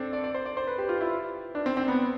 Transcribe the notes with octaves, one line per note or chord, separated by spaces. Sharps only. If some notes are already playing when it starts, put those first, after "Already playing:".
Already playing: C4 D4 A4
D5
D5
C5
D5
C5
B4
G4
F4
E4
D4
C4
C4
B3